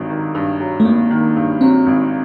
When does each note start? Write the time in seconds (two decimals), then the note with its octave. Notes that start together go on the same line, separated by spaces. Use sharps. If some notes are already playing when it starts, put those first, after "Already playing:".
Already playing: G#1 G2 F#3
0.10 D#3
0.35 G2
0.60 F#3
0.80 A3
0.85 G#1 A#3
1.11 D#3
1.36 G2
1.61 F#3 C4
1.87 G#1